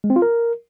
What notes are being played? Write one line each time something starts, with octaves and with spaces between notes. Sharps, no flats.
G#3
C4
F4
A#4